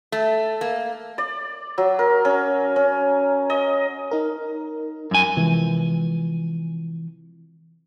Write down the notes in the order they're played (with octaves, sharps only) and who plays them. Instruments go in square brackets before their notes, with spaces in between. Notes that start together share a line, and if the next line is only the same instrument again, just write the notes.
[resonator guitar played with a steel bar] A3
A#3
[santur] D5
F#3
A#4
C#4
C#4
D#5
[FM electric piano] D#4 A#4
[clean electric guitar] F#2 G#5
[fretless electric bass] C3 E3 F3 G#3